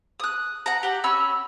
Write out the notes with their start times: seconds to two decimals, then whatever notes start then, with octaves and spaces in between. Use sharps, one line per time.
0.20 D#6 F#6
0.66 F#5 A#5
0.83 G4 F#5
1.04 C#4 B5 C#6 E6